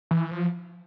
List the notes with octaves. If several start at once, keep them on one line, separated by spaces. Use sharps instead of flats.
E3
F3